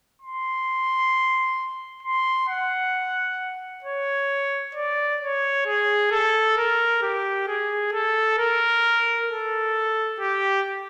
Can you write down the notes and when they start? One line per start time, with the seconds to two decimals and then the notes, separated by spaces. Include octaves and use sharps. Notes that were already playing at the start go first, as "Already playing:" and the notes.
0.21 C6
2.03 C6
2.48 F#5
3.84 C#5
4.75 D5
5.21 C#5
5.66 G#4
6.11 A4
6.57 A#4
7.02 G4
7.47 G#4
7.93 A4
8.38 A#4
9.29 A4
10.20 G4